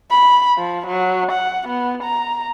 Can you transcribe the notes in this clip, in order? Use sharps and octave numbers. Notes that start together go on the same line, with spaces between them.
B5
F3
F#3
F#5
B3
A#5